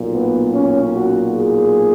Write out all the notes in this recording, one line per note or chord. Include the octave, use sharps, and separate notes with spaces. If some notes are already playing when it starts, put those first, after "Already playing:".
Already playing: B1 A#2
B3
C#4
F#4
G#4